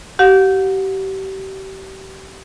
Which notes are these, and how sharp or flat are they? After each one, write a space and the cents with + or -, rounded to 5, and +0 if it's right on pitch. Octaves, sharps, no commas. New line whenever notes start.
G4 -35 F#5 -35